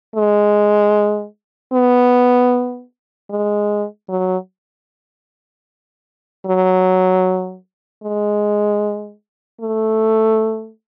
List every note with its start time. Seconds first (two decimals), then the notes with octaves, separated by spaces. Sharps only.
0.16 G#3
1.73 B3
3.30 G#3
4.09 F#3
6.46 F#3
8.03 G#3
9.61 A3